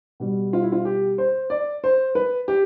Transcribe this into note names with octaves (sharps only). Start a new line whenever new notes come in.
B2 G3
F4
E4
F4
G4
C5
D5
C5
B4
G4